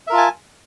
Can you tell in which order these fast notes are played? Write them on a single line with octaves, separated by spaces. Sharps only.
E5 A#4 F4 A5 G#5